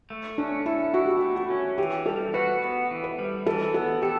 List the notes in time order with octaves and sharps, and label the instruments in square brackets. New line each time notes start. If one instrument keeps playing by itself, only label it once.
[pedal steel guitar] A3
[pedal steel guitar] C#4 [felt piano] D4
[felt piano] E4 [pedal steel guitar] A4
[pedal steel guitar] E4 [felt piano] F#4
[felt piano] G4
F#4
[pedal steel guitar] A3
[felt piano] F#4
[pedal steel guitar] C#4
[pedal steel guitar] E3 [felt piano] G4
[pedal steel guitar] G3 [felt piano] A4
[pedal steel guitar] F#4 [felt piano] B4
[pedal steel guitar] B3
E3
[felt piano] B4
[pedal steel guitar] G3
[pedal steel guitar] E3 [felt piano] A4
[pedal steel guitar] B3 [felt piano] A4
[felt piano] G4 [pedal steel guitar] A4